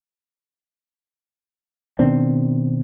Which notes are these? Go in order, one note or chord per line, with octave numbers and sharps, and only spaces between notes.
B2 D#3 C4 D4